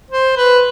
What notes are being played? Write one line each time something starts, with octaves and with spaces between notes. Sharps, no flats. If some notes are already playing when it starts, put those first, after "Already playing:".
C5
B4